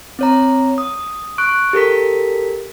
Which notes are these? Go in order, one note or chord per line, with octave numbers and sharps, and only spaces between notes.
C4 C#5 A#5
D#6
C#6 F#6 D7
G4 A4 A#4 B6